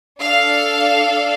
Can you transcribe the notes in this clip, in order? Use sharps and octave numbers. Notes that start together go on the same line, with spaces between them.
D4 A4 F5